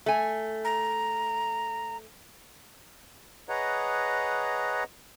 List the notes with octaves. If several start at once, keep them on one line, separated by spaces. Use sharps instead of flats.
A3 G#5
A#5
G#4 B4 C#5 D#5 F#5 A#5